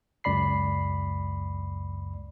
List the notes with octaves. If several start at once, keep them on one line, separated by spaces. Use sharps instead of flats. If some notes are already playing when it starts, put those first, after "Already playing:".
C#2 F#2 D5 B5 C7